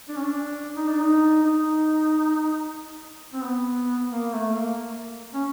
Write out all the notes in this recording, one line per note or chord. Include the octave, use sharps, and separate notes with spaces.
D4
C#4
D4
D#4
D4
D#4
D#4
C4
B3
A#3
A3
A#3
C#4